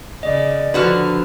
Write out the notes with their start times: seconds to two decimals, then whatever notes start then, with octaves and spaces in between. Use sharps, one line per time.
0.23 C#3 D5 D#5
0.74 D3 F3 D4 F#4 B4 F6